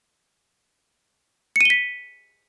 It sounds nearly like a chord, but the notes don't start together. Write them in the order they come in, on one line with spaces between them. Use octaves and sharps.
C#7 D#7 G7 B6